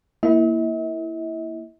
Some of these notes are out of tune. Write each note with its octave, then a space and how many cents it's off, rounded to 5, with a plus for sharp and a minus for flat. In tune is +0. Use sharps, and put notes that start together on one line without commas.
A#3 +0 E4 +0 E5 -45